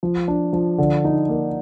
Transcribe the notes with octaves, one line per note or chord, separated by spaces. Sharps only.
F3
D4
F3
D3
D#4
A#3